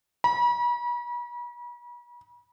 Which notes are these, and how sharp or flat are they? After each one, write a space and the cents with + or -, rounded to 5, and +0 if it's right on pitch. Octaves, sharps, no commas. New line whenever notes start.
B5 -40